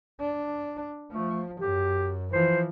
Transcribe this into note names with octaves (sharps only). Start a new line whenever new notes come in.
D4
F3 A3
F#2 G4
E3 F3 C5